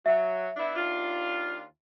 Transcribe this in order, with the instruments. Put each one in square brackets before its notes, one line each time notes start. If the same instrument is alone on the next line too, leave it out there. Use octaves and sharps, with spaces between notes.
[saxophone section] F#3 [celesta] E5
[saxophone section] B3 D4 E4
D#2 D4 F4